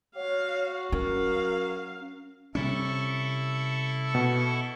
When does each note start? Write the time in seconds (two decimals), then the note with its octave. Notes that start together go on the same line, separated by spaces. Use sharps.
0.16 F#4 C#5 F5
0.92 F#3 C#4 A#4 F5
2.55 C3 G3 C#4 E4 A4 C#6
4.15 B2